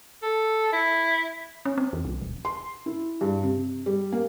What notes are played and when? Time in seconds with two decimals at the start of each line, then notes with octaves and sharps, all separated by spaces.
0.23 A4
0.73 E4
1.65 C#4
1.78 C4
1.93 E2
2.05 C2
2.22 D#1
2.45 C6
2.86 E4
3.21 G2
3.43 C3
3.86 G3
4.12 A#3